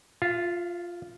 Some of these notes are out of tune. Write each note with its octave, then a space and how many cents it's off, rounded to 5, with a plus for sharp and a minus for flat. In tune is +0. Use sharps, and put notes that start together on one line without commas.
F4 +0 E5 +45